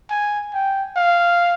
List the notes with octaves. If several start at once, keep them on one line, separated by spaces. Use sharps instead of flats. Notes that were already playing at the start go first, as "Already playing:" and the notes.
G#5
G5
F5